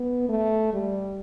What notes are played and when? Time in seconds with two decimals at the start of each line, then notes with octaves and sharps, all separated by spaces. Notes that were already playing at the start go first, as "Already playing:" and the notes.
Already playing: B3
0.29 A3
0.73 G3